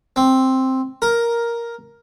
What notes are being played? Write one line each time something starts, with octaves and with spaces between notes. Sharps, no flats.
C4
A#4